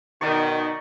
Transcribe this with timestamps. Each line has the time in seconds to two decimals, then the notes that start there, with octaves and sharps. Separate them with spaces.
0.21 B2 D#3 D#4 D5 C#6